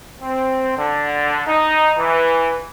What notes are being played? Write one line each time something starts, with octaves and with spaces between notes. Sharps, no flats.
C4
D3
D#4
E3